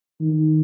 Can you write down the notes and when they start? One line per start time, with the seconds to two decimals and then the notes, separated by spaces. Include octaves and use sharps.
0.21 D#3